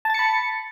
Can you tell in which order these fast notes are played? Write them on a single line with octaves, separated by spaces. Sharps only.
A5 A6 C#7 B5